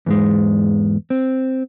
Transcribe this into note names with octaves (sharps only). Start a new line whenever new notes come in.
E2 G#2 G#3
C4